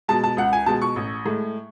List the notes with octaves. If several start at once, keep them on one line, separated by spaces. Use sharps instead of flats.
B2 G#3 A5
A5
C#2 F#5
G#5
B2 G#3 A5
C#6
A1
A2 G#3